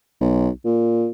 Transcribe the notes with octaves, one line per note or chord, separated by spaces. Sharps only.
B1
A#2